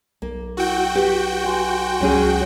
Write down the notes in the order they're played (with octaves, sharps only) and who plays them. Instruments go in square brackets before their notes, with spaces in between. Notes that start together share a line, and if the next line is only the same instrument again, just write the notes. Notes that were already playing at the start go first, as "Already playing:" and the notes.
[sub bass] B1 [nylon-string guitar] A#3
[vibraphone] E4 F#5 [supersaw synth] F#4 G5
[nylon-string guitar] G4 [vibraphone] B4
[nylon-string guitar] F4 [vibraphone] G#5 C6
[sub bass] C#2 [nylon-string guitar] F#3 C#4 G#4